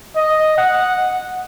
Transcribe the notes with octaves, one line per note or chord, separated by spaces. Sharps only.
D#5
F#5